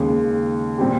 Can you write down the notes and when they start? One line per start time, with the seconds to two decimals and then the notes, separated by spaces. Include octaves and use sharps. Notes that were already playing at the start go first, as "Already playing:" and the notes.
Already playing: D#2 C#3 G#3
0.78 A#2 G3 C4 G4